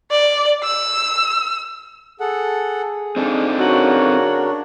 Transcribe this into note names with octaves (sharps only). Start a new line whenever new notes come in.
D5
E6
G#4 A4 F#5
C4 D4 D#4 A4
C#3 F#4 A#4 C#5